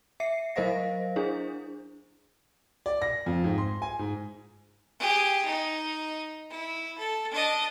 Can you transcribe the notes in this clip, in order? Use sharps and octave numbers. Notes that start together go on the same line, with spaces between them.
E5 C7 C#7
F#3 A#4 C5 D#5 F5 A#6
D4 E4 G#4 C5
D5
A#6
F2
G#2
C6
G#5
G#2
G4 G#4
D#4
E4
A4
D4 D#5